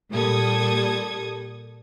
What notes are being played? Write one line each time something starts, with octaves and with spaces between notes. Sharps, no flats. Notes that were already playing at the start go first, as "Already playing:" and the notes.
A#2 G3 A4 D#6 G#6